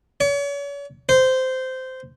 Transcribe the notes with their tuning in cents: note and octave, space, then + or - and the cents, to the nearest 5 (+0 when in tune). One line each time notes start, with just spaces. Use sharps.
C#5 +40
C5 -15